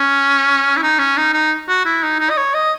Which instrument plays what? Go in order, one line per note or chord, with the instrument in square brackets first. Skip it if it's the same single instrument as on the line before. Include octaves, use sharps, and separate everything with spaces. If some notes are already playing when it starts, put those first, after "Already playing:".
Already playing: [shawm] C#4
E4
D#4
C#4
D#4
D#4
F#4
E4
D#4
D#4
D#5
C#5
D#5